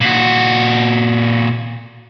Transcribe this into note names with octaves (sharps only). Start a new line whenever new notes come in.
A#2 F#4